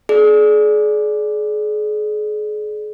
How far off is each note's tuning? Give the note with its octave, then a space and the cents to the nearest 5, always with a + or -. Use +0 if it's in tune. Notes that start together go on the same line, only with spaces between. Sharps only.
G#4 +30 D5 +0